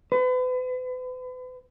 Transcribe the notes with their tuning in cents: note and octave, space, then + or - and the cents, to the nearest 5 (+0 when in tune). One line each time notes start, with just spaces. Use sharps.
B4 +40